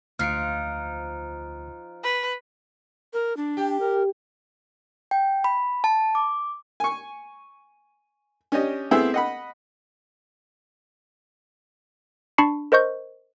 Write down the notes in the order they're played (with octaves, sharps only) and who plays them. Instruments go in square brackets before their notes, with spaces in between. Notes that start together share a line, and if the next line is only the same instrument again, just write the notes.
[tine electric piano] D2 C7 [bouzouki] F3 D#4 [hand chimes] F6 F#6 D7
[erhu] B4
[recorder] A#4
D4
[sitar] G4
[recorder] A#4
[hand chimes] G5
B5
A5
D6
[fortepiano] G#5 C#6
C#4 D4 G4 D#5
A3 B3 C4 E4 G#4
D#5 F#5 B5
[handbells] D4 A5 B5 C#6 C7 C#7
A#4 C5 D#5 C#6 G6